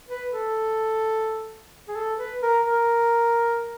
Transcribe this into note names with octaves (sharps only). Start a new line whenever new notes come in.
B4
A4
G#4
A4
B4
A#4
A#4